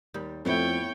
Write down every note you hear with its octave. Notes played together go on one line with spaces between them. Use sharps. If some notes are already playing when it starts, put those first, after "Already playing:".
D#2 G3
F2 A3 B3 E4 C#5 G5